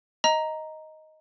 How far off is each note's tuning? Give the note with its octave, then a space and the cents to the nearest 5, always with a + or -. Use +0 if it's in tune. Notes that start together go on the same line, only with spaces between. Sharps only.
D#5 +10 A#5 +0